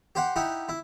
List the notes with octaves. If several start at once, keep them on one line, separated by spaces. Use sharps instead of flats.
G4 C5 F#5
D#4 E4 G4 F#5
E4